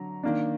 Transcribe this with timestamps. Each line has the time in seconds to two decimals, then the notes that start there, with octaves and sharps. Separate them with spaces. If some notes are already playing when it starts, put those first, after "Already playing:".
Already playing: D3 F#3 A#5
0.23 D#3 A#3 D4